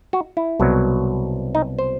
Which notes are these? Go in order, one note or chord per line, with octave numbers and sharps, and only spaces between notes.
F#4
E4
C2 B2 F#3
D#4
C5